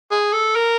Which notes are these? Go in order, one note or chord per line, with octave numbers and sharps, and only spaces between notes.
G#4
A4
A#4